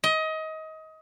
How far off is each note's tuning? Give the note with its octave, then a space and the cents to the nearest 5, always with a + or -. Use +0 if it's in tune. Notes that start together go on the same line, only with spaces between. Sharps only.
D#5 +25